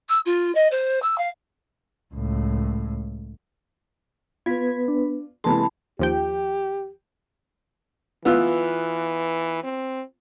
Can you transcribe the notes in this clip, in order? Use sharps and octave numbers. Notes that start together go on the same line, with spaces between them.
E6
F4
D#5
C5
E6
F5
C#2 A2
B3 F4 B4 G#6 B6
D4
C3 E3 G#3 A#3 A4 A5 B5 C6
D#2 F3 G4 G5
E3 B3 F4 E6
C4